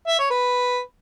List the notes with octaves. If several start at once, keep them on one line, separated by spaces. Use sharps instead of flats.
E5
C#5
B4